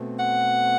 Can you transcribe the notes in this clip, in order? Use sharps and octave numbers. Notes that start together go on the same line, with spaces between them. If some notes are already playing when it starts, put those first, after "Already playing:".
Already playing: B2 A3 C4
F#5